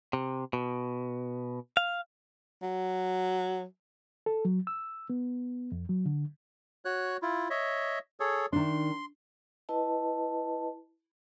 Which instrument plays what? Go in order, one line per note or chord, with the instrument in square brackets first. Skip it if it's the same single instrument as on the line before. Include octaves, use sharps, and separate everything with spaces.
[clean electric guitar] C3
B2
F5
[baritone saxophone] F#3
[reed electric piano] A4
F#3
E6
B3
F2
F#3
D3
[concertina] F#4 C#5 F#6
E4 F4
C#5 D#5 E5
G#4 A4 C#5
[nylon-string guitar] D#3 D4 [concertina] C6
[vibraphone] E4 B4 D#5 A5